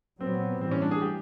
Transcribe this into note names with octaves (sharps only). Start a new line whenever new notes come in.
A#2 F#3 B3 C4
A2 E3 G3 C4
C#4
D4
G#4
G4